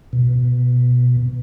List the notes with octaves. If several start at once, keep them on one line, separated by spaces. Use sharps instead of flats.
B2